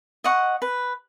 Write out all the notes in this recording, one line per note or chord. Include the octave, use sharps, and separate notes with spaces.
D#5 F#5 C#6
B4